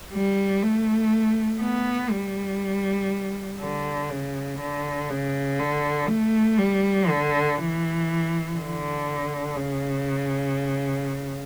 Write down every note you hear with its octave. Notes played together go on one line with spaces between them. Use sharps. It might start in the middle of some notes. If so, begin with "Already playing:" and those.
G3
A3
B3
G3
D3
C#3
D3
C#3
D3
A3
G3
D3
E3
D3
C#3